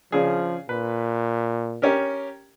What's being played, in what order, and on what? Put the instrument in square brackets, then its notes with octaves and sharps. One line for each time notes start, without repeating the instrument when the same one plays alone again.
[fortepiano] C#3 D4 G#4 [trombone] F3
[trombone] A#2 [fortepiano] B4
[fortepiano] C#4 G4 A#4